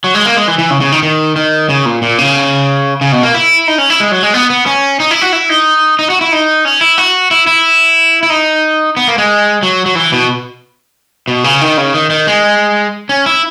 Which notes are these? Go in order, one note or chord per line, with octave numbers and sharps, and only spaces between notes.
F#3
G#3
A#3
G#3
E3
E3
C#3
C#3
D#3
D#3
D#3
C#3
A#2
A#2
C#3
C#3
B2
A#3
E4
D#4
C#4
E4
G#3
F#3
G#3
B3
B3
C#4
D#4
E4
F#4
E4
D#4
D#4
F#4
E4
D#4
C#4
E4
F#4
E4
E4
E4
D#4
B3
A#3
G#3
F#3
F#3
E3
B2
B2
C#3
D#3
C#3
D#3
D#3
G#3
C#4
E4